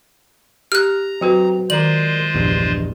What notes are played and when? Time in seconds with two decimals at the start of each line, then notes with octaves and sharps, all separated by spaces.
0.72 G4 A#5 F6 F#6
1.21 F#3 C4 F#4 G4 B4
1.70 D#3 G#3 F4 A#4 C5 D5 F#7
2.34 A#1 E2 G2